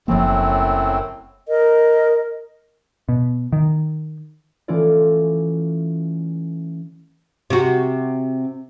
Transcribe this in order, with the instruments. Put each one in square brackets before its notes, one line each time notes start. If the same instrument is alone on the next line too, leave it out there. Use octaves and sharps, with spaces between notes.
[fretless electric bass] F#1 F3 A#3 [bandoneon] F#2 A2 C4
[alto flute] A#4 [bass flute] D#5
[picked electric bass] B2
D#3
[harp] E3 A3 C#4 F4 D5
[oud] C3 F#4